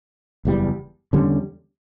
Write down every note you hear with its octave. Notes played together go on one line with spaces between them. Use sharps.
F#1 E2 C#3 G3
E2 D3 G3 C#4